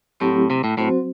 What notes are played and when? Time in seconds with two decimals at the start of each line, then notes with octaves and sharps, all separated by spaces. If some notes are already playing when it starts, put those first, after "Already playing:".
0.20 A2 F#3 A3 C4 E4 G4
0.50 C3
0.64 A2
0.78 A2 F#3 C4 F#4 C5